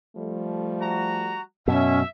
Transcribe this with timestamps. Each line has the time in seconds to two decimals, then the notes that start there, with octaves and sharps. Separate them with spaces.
0.17 F3 G3 A3
0.80 F#4 A#5
1.68 F#2 B2 C#4 E5